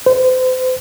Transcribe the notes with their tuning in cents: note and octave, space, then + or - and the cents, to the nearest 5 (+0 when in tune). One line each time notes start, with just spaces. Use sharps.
C5 -35